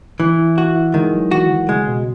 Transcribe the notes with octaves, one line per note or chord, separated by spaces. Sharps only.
E3 E4
E4
E4 F#4
E4
D#3 G#3
F#3
E3 F#4
D#3
C#3 G#3
B2